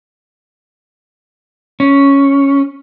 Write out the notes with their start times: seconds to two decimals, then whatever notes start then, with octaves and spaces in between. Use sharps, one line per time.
1.80 C#4